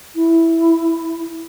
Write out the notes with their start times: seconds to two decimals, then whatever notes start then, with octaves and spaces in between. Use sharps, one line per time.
0.16 E4